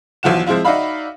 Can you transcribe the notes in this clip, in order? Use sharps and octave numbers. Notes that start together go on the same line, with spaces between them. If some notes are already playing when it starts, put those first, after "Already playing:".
B1 E3 F3 F4 F#4 E7
F3 G#3 C4 E4 F4
D#4 F#4 D5 E5 F5 B5